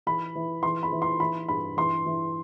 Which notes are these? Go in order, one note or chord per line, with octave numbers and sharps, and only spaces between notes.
E3 B5
E3
E3 C6
B5
E3
C6
E3 B5
G2 B5
E3 C6
E3